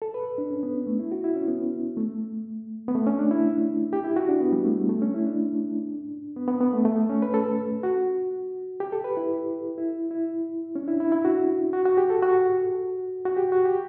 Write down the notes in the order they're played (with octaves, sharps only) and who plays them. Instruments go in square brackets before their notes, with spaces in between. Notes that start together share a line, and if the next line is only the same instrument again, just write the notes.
[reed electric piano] A4
B4
D4
C#4
B3
A3
E4
F#4
E4
C#4
B3
A3
B3
A3
C#4
D4
E4
G4
E4
F#4
D4
B3
G3
A3
A3
C#4
E4
D4
B3
B3
B3
A3
A3
C#4
B4
A4
F#4
G4
A4
B4
E4
E4
E4
C#4
D4
E4
E4
E4
F#4
F#4
F#4
G4
A4
F#4
F#4
G4
F#4
G4